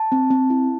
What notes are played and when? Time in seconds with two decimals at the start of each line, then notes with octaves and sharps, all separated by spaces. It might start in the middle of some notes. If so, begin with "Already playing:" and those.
Already playing: A5
0.12 C4
0.31 C4
0.50 E4